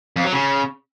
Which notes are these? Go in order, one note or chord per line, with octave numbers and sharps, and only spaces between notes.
F2
F#3
C#3